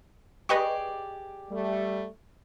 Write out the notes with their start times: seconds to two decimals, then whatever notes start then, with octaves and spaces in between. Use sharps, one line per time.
0.49 G4 G#4 B4 D5 D#5 C#6
1.50 G3 A3